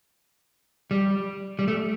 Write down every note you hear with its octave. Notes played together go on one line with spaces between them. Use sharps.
G3
G3
A3